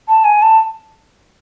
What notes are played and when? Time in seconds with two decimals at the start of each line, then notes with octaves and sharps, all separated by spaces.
0.09 A5
0.25 G#5
0.42 A5